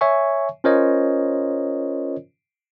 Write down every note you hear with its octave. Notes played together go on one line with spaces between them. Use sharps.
C#5 E5 G#5 C#6
C#4 F4 A#4 C5 C#5 D#5